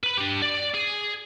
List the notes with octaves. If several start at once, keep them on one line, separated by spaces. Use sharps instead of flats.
B4 B5
D4 G4
D5
G#4